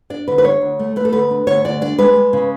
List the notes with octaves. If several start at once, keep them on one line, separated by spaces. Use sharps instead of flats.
D4 D5
D3 B4
B4
D4 C#5
D2
A3
A3 B4
A4
D2 B4
D4
D2 C#5
D2 D5
D4 D5
G#3 B4
G#3
C#3